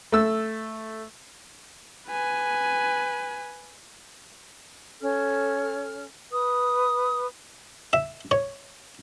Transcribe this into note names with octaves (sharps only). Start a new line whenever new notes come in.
A3 E6
B4 G#5
C#4 A4 F6
B4 D#6
E5
C#5